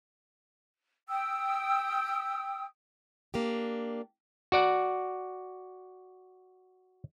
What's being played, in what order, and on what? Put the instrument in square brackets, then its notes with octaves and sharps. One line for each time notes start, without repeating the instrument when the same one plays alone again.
[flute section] G5 D#6 E6
[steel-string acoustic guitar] A#3 D4 G4
[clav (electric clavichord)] F#4 D5 F#5